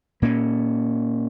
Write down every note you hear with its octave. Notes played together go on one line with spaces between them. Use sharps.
A#2 A#3 C#4